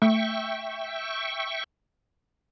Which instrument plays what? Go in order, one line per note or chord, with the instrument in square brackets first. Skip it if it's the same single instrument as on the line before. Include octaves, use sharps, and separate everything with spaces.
[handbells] A3 [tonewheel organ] E5 G5 C#6